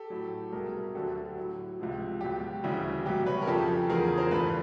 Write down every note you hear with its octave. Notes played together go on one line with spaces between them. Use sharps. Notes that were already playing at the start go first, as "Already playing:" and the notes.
Already playing: G4 A4
A2 F#3
C2 B2 G3 G#4 A#4
D2 D3 F#3 G4 A4
A2 F#3
C#2 C3 F3
C#2 B2 F#3 G4
D2 C#3 E3 G3
C2 B2 F#3 G4
B4 C#5
A#4
F2 C#3 F3 G4 A4
E2 C#3 F3 G#4 A#4
A#4 C5
G2 E3 G3 A4 B4